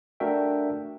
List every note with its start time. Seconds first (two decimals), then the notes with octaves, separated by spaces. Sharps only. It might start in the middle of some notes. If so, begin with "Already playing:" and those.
0.20 A3 D4 F#4 A#4 E5 G5